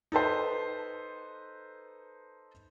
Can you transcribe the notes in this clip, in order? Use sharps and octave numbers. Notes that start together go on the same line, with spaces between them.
D#4 A4 B4 C5